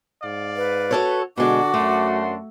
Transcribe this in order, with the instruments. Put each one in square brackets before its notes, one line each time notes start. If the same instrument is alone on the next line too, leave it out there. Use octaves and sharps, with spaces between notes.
[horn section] G#2 D5 F5
[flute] B4
[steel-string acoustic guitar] F#4 A4 C#5
[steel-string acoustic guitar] B2 G#3 [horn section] D3 D4 [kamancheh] F#4 [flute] D6
[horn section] F#2 D4 C6 [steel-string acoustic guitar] A3